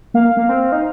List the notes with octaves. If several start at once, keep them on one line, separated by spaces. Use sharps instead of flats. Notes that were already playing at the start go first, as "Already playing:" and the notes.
A#3 F5
A#3
C4
D#4